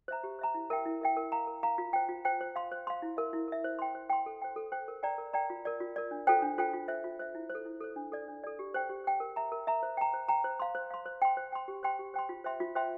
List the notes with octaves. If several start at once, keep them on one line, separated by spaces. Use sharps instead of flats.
C5 E5 A#5
G4
C5 E5 A#5
E4
A#4 E5 G5
E4
A#4 E5 G5
A#4
F5 A#5
A#4
F5 A#5
F4
C5 G5
F4
C5 G5
C5
F5 C6
C5
F5 C6
E4
A#4 E5
E4
A#4 E5
C5
G5 C6
C5
G5 C6
A4
C5 G5
A4
C5 G5
A#4
D5 G5 A#5
A#4
D5 G5 A#5
F4
A#4 D5
F4
A#4 D5
D4
F4 A4 C5 G5
D4
F4 A4 C5 G5
F4
C5 E5
F4
C5 E5
E4
C5
A4
E4
A4 C5
D4
A4 D5
D4
A4 D5
G4
C5 G5
G4
C5 G5
A#4
E5 A#5
A#4
E5 A#5
C5
G5 A#5
C5
G5 A#5
C5
F5 C6
C5
F5 C6
C5
G5 C6
C5
G5 C6
G4
C5 G5 C6
G4
C5 G5 C6
F4
C5 E5 G5 C6
F4
C5 E5 G5 C6